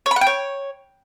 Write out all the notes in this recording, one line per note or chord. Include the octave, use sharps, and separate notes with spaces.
C#5
B5
F#5
G5
C#5